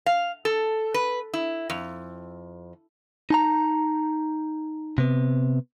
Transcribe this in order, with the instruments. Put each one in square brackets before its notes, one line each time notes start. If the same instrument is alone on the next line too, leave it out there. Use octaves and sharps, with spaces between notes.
[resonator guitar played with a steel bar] F5
A4
B4
E4
F2
[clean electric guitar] D#4 A5 A#5
C3 B3